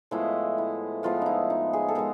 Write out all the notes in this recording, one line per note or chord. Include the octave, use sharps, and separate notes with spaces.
A2 F3 G#3 B3 E4
E4
A2 F3 G#3 B3 F4
D#4 E4
D#4
G#4
A4
G#3 B3 A#4